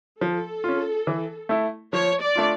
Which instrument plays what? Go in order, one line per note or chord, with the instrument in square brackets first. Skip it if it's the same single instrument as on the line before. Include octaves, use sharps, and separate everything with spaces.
[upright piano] F3 [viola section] A4
[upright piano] C#4 F4
E3
A3 E4
[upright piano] F3 [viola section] C#5
[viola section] D5
[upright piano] A3 D4 F4